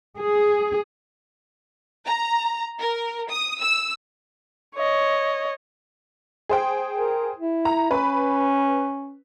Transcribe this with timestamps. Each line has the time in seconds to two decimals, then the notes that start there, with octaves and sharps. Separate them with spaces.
0.17 G#4
2.06 A#5
2.79 A#4
3.28 D#6
3.60 E6
4.76 C#5 D#5
6.49 G#4 C5 G5
6.98 A#4
7.38 E4
7.65 A#5
7.91 C#4 B4 B5